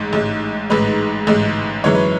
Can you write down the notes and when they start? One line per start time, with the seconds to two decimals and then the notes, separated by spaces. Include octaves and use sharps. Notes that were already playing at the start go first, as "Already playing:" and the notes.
Already playing: A1 G#2
0.13 A1 G#2 G#3
0.70 A1 G#2 G#3 B4
1.27 A1 G#2 G#3
1.84 F#2 E3 G#3 C#5
1.95 B4